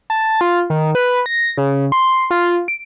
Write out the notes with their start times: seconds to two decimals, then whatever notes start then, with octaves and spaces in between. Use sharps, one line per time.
0.10 A5
0.41 F4
0.70 D#3
0.95 B4
1.26 A#6
1.58 C#3
1.92 C6
2.31 F4
2.68 D7